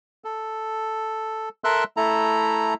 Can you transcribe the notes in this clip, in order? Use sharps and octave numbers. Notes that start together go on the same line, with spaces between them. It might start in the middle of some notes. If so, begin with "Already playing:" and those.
A4
A4 A#4 E5 C6 E6 F#6
A3 E4 A4 A#5